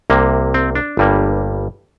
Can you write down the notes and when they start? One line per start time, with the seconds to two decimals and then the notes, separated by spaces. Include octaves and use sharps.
0.10 C2 C3 A#3
0.54 C4
0.75 D4
0.97 G1 G2 G3 A#3